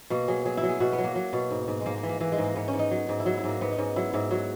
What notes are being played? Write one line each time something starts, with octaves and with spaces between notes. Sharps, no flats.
B2 A#3
F#3 G#4
F#3 G#4
E4
F#3
G#4
B2 F#4
B3
F#3
A#3
F#3
B2
G#2
G#2
G#3
G#2 A#3
A#3
E3
A#3
E3 A#3
G#3
G#2
A#3
G#2 B3
C#4
G#2
D#4
F#3
G#2
E4
F#3 F#4
E4
G#2
A#3
G#2 B3
D#4
G#2 C#4
F#3 E4
G#2 E4
F#3 F#4